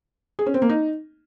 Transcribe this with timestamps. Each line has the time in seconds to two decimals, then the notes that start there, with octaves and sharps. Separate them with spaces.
0.39 G#4
0.46 C#4
0.54 C4
0.62 A#3
0.69 D#4